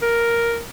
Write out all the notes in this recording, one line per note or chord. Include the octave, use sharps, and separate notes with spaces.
A#4